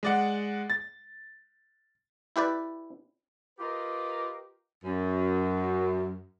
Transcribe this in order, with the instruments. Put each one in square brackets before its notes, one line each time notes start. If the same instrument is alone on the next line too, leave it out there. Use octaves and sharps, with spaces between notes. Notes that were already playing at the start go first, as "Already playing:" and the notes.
[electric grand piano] G#3 D5 F#5
A6
[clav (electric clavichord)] E4 G4 B4 D5
[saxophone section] F4 G4 A#4 B4 D#5
F#2